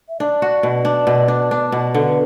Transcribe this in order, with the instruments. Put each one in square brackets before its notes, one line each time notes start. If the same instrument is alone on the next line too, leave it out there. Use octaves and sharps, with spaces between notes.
[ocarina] E5
[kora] D4 [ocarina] D5
[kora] F#4
B2
D4
B2
D4
D4
B2
[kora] D3 [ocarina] B4